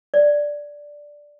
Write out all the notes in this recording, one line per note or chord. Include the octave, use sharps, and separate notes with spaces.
D5